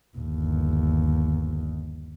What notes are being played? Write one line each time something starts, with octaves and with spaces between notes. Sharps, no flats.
G1 D#2